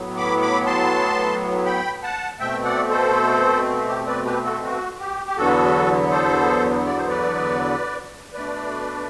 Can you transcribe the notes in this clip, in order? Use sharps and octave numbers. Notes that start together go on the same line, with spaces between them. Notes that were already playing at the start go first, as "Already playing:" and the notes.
Already playing: A2 F#3 B3
B5 D6
B5 D6
A5 C6
G5 B5
F#5 A5
B2 A3 C4 E5 G5
D5 F#5
A4 C5
G4
B4 D5
G4 B4
F#4 A4
F#4
G4
G4
E2 D3 F#3 B3 F#4 A4
A4 C5
D5
C5
B4 D5
B2 A3 D4 B4 D5